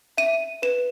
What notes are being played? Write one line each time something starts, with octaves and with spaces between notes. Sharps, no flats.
E5 D#7
B4 E7